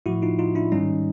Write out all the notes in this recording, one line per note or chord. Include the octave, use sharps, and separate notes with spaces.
A2 F3 E4 F#4
D#4 F4
D#4 F4
D4 E4
G#2 D#3 G3 C#4 D#4